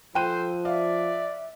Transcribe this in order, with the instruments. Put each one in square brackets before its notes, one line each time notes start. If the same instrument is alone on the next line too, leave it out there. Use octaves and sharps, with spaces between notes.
[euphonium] F3 [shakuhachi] A4 [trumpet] C5 [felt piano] G5 F#6 D#7
[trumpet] D5 [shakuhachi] E5 [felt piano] F5